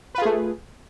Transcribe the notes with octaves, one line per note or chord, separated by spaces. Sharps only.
A3 F4 G#4 B4